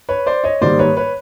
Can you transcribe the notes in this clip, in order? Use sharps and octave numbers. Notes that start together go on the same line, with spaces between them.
B4 C#5
C5 D5
C#5 D#5
G#2 D#3 G3 A#3 C5 D5
B4 C#5
B4 C#5